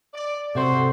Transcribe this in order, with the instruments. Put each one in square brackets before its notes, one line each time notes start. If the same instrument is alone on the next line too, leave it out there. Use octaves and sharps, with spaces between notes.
[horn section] D5
[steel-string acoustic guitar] C3 [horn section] F#4 C5 [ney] A4